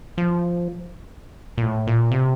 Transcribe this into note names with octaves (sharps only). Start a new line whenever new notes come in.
F3
A#2
A2
A#2
C3